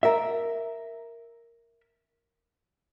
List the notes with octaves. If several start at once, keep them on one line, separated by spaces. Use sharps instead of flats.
A#4 E5